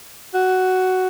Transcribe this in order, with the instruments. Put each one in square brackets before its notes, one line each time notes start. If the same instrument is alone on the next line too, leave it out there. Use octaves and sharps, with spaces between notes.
[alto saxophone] F#4